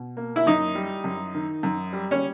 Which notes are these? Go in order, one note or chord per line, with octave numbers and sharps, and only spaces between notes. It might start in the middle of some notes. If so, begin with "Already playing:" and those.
Already playing: B2
A#3
E4
F#2 D#4
G3
F#2
D#3
F#2
G3
C#4